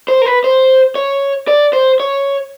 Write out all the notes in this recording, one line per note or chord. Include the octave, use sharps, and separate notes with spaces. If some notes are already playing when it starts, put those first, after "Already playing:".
C5
A#4
B4
C5
C#5
D5
C5
C#5